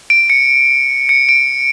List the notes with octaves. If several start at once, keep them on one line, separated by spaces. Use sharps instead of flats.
D7
C#7
C#7
D7